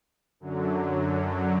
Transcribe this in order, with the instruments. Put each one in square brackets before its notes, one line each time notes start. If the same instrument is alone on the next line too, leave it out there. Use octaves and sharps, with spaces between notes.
[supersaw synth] F#2 D3 F#3